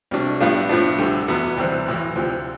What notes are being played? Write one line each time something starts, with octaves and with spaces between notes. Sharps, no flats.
C2 B2 A3 D4
A2 G3 B3 D4 F4
A2 F3 B3 D4
D2 D3 G3
E2 B2 B3
D2 C3 E3 G3 C4
B1 A2 E3
D2 C3 F3